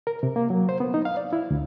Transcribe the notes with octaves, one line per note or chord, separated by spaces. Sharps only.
A#4
C3
A#3
F#3
C5
B3
D#4
F5
D5
E4
D2